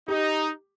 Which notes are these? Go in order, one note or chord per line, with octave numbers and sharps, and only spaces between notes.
D#4 G4